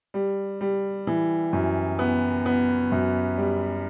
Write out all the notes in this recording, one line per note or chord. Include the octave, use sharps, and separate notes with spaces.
G3
G3
E3
F#2
B3
B3
F#2
G3